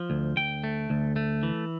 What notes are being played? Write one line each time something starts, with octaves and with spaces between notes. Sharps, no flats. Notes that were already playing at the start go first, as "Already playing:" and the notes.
Already playing: F3
D2
D2 G5
A3
D2
A3
E3